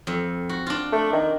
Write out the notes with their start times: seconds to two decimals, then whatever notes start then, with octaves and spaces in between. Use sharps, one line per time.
0.07 F2
0.49 F#4
0.66 D4 F4
0.92 A3
1.13 D#3